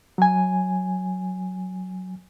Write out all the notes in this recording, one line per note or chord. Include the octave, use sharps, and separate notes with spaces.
F#3 G#5